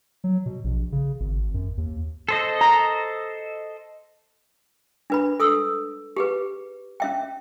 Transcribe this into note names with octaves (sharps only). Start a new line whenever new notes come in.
F#3
B2
A#1
C#3
G#1
F#2
D#2
A4 C5 D#5
A#5
D4 B4 B5
A4 D#6 E6
G4 G#4 B4
C#4 E5 G5